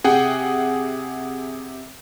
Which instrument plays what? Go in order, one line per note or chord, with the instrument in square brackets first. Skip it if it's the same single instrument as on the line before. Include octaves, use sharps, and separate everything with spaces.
[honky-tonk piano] C3 [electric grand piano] G#4 F#5 G5